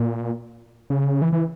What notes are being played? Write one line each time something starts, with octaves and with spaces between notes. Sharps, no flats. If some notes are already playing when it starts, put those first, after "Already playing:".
Already playing: A#2
C#3
E3
E3